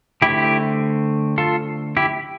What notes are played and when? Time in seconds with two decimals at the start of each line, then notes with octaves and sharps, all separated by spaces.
0.22 D3 A3 C4 E4 G4
1.38 F4 A4
1.97 E4 G4